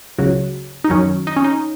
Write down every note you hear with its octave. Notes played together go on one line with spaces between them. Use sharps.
C#2 C#3 F#3
D#4
F#2 D#3 F#3 C#4
D#4
C#4
D#4